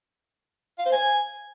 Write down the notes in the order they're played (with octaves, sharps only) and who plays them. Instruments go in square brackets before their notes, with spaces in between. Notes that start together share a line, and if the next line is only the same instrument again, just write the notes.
[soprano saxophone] F5
C5
G#5